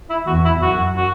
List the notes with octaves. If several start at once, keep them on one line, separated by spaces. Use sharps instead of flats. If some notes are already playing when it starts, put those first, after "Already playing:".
E4
E2 F#4
E4
F#2 F#4
F#4